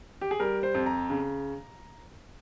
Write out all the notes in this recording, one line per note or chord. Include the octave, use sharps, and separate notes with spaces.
G4
G#4
G3 A#4
C5
F2
A#5
C#3